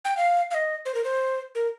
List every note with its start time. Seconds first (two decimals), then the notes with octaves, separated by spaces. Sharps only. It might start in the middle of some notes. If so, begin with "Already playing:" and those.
0.05 G5
0.17 F5
0.51 F5
0.54 D#5
0.85 C5
0.95 A#4
1.04 C5
1.55 A#4